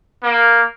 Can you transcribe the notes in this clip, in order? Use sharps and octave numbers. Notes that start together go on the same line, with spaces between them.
A#3